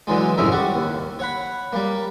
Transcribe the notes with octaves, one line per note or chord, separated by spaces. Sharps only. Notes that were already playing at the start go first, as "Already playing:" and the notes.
D3 E3 F#3 G#3
C2 F2 G#2 C#4 A#4 E5
G3 F#5 C#6
D#2
C#5 F#5 B5
G3 A#3